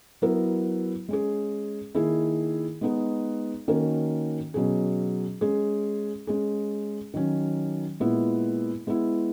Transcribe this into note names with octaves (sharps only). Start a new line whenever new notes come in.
F#3 B3 E4 A#4
G#3 C#4 G#4
D#3 A#3 E4 G#4
G#3 B3 D#4 G#4
D#3 A#3 C#4 F#4 A#4
B2 F#3 C#4 G#4
G#3 C#4 G#4
G#3 C#4 G#4
D#3 F#3 C#4
A#2 G#3 B3 E4
G#3 B3 E4